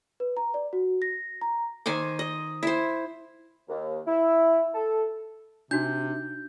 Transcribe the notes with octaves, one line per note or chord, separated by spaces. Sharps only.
B4
A#5
D5
F#4
A#6
A#5
D#3 C5 G#5 D6
D#5
E4 C5
D#2
E4
A4
C3 D4 D#4 F#4 G6